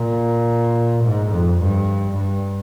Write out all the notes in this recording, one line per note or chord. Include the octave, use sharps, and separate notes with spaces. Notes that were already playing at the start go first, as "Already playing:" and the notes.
Already playing: A#2
G#2
F2
G2
G2